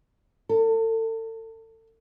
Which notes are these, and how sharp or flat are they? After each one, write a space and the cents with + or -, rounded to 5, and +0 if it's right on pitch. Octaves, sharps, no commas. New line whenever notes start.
A4 +35